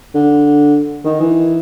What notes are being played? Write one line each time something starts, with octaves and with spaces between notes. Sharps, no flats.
D3
D#3
E3